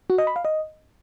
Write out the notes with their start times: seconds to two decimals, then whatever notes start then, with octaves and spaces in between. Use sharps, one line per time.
0.10 F#4
0.18 D#5
0.27 B5
0.36 F5
0.45 D#5